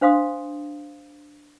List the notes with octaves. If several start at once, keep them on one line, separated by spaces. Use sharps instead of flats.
D4 C5 F5 C6 D#6